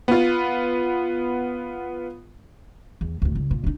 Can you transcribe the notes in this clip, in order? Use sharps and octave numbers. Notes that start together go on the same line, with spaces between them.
B3 F4
E2
D2 A2
C#2
A#2
D4 D#4